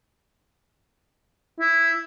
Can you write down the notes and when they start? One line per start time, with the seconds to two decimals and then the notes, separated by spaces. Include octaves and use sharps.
1.60 E4